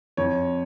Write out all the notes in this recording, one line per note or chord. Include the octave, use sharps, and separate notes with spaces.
F2 C#5